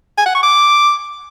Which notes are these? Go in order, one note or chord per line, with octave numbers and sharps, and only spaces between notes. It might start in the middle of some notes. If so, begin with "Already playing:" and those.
G#5
F#5
C#6
D6